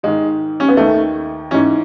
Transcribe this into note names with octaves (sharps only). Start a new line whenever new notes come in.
G#2 D#3 G#3
C#4
B3
D#2 D#3 A3
G#2 E3 C#4